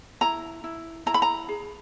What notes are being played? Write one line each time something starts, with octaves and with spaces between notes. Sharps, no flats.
E4 A#5
E4
E4 A#5
B5
A#5
G#4